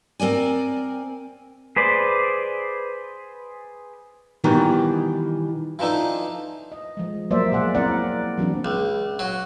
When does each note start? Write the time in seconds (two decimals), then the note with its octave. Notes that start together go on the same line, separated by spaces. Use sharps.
0.20 C4 A#4 D5 G#5
1.76 G#4 B4 C5 D5
4.44 B2 D#3 E3 G3
5.79 E3 F3 D4 D#4 A4
6.72 D#5
6.97 F3 G#3
7.31 F#3 A#3 C5 D5 E5
7.52 B2 G#4 F#5
7.75 A#3 C4 E4 A#4 D5 F#5
8.38 E3 F#3 C4 D4
8.65 C#2
9.19 F#3